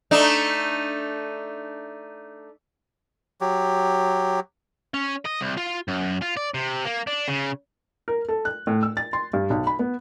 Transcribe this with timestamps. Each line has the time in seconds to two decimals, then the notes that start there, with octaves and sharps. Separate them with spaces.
0.11 A3 D4 D#4
3.41 F#3 G4
4.94 C#4
5.26 D#5
5.41 C2
5.58 F4
5.88 F#2
6.22 F4
6.37 D5
6.54 C3
6.85 A#3
7.07 D4
7.28 C#3
8.08 A#4
8.29 A4
8.45 F#6
8.67 A2
8.83 E6
8.97 A6
9.13 C6
9.33 G2
9.50 B1
9.67 B5
9.79 B3